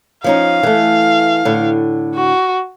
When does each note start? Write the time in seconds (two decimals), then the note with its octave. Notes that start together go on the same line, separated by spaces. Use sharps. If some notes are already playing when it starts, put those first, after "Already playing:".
0.24 F3 C#4 D#4 F5
0.63 E3 A3
1.45 A2 D3
2.15 F#4